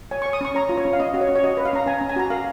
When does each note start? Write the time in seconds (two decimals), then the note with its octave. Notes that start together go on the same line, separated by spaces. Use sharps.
0.11 C#5 G#5
0.22 C#6
0.26 C#5
0.33 D#6
0.41 C#4 C#6
0.55 C#5 A#5
0.69 F4
0.78 C#5
0.85 C#4
0.93 F5
0.99 C#4 D#5
1.14 F#4
1.21 C#5
1.29 C#4
1.36 C#5
1.43 F#4 D#5
1.57 B4
1.65 F5
1.73 C#4 A#5
1.86 C#4 G#5
1.98 A#5
2.01 C#4
2.09 G#5
2.16 F#4 A#5
2.30 A#4 F5